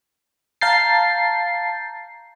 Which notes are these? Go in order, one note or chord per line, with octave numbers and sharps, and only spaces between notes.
F5 A5 A#5 G6 A6 C7